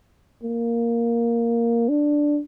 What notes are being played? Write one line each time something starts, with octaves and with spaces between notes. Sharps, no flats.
A#3
D4